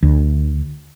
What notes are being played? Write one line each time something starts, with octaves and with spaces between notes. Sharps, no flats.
D2